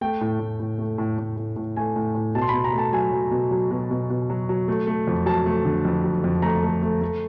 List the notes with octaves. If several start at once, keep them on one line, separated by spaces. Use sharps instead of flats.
A3 G5
A2
A2
A2
A3
A2
A2
A2
A2
A3 G#5
A2
A2
B2 A5
C6
B2 B5
A#5
A3
A5
F#3 G#5
F#3
B2
F#3
B2
B2
B2
F#3
F#3
A3
A3
F2
F#3 A5
A3
D3
F2
F#3
F2
A3 A#5
A3
A3
A3